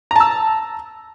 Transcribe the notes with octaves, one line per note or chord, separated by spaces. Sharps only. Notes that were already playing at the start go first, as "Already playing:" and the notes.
A5 A#5 E6